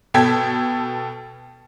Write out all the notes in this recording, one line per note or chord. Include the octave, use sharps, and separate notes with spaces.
B2 A4 G5 G#6 B6